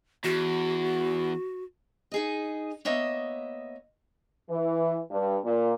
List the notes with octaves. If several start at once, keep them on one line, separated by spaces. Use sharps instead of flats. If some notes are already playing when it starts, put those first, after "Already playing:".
E2 F#4
D#4 G#4 D#5
A#3 B3 C#5 D#5 E5
E3
G2
A#2